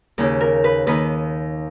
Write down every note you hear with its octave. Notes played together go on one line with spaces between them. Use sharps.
D#2 C#3
A#4
B4
D#2 D#3 B4